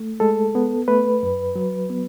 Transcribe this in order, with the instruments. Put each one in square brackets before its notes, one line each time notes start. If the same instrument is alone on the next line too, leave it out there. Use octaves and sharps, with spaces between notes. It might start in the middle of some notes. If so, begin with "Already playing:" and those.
Already playing: [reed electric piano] A3
G#3 A4
B3
A3 B4
F#2
F#3
B3